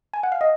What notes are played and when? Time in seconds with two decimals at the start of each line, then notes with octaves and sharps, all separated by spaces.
0.13 G#5
0.23 F#5
0.32 F5
0.41 D#5